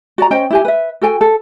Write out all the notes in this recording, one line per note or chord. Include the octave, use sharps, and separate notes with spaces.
F#4 D5 A#5
C#4 C5 D#5 G5
E4 G4 G#5
B4 E5
F#4 A4 G5 G#5
A4